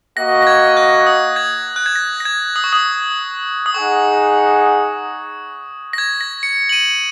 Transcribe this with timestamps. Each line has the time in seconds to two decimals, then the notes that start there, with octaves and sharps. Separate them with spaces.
0.17 A#3 F#4 D#5 F#5 A#6
0.42 A#6
0.47 G#6
0.77 F#6
1.06 D#6
1.36 G#6
1.76 F#6
1.86 G#6
1.95 A#6
2.20 A#6
2.25 G#6
2.56 D#6
2.64 C#6
2.73 D#6
3.66 D#6
3.74 D#4 G#4 F#5 C#6
5.93 A#6
5.98 G#6
6.21 A#6
6.43 C#7
6.69 F#7
6.72 D#7